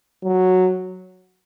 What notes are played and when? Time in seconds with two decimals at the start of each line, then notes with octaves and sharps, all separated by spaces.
0.24 F#3